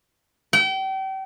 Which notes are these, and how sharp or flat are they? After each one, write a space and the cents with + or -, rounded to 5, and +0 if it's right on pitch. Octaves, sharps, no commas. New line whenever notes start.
G5 -35